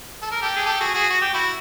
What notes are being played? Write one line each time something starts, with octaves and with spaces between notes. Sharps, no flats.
A4
A#4
G4 A4
G#4
G4 A4
F#4 G#4
F#4 G#4
F#4
G4
E4 F#4